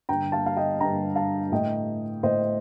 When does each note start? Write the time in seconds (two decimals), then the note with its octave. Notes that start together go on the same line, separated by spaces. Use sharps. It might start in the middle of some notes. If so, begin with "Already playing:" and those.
0.09 G2 D3 G5 A#5
0.32 F5 A5
0.46 F5
0.57 D#5 G5
0.80 G2 D3 G5 A#5
1.16 F5 A5
1.52 A2 D#5 G5
2.23 A2 C5 D#5